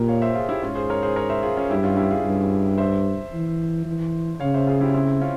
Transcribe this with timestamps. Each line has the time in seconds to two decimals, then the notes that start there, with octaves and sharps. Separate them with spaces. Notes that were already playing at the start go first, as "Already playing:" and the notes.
Already playing: A#2 G4 A#4
0.08 C#5 F5
0.22 C5 E5
0.35 F4 G#4
0.49 E4 G4
0.62 G#2 C#4 F4
0.75 G#4 C5
0.90 A#4 C#5
1.03 G#4 C5
1.16 A#4 C#5
1.30 C5 E5
1.43 F4 G#4
1.57 C#4 F4
1.70 G2 E4 G4
1.83 C#4 F4
1.97 E4 G4
2.10 F4 G#4
2.25 G2
2.78 C5 E5
3.33 E3
3.86 E3
4.40 C#3 C#5 F5
4.54 C5 E5
4.67 F4 G#4
4.81 E4 G4
4.94 C4 E4
5.21 C#4 F4